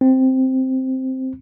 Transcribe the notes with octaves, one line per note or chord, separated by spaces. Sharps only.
C4